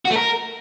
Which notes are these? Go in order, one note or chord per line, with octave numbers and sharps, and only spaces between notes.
F#4
A3
A#4